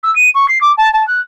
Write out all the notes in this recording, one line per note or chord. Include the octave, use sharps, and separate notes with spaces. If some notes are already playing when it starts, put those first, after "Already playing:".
E6
D#7
C#6
C7
D6
A5
A5
F#6